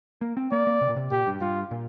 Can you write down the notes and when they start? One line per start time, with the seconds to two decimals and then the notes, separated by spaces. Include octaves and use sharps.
0.21 A#3
0.37 C4
0.52 A#3 D5
0.67 A#3
0.81 C3
0.89 A#2
0.96 C3
1.11 A#2 G4
1.27 G2
1.41 G2 F4
1.71 A#2